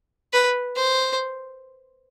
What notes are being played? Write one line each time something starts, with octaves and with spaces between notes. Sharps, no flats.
B4
C5